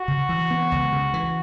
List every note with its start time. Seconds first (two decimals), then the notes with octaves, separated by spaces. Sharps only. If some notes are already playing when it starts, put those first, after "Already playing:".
Already playing: F#4
0.08 C#3
0.29 E3
0.51 B3
0.72 C#2
0.92 C#3
1.14 E3